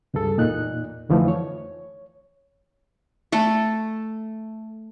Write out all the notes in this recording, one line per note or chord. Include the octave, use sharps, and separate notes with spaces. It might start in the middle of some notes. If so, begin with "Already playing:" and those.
C#2 G2 G#4 A4
E2 A#2 D#4 F#6
F2 D3 E3 F3 A3 D#4
C#5
A3 A4